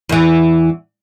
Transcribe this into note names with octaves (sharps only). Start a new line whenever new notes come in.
E2 E3